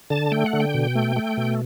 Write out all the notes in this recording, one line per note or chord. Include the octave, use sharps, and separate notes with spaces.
D3 A5
A3 G5
F#5
D3
G5
B2
A3
A3
B2